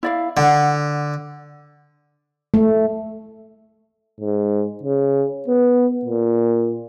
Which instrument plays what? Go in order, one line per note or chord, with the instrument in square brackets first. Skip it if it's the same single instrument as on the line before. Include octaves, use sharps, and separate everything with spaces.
[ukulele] E4 D5 F5
[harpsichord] D3 [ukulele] F#5
[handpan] A3
[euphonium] G#2
C#3
B3
A#2